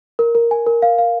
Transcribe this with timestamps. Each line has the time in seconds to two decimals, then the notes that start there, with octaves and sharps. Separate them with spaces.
0.19 A#4
0.35 A#4
0.51 G#5
0.66 A#4
0.82 F5
0.98 F5